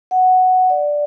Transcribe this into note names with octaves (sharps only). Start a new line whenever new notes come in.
F#5
D5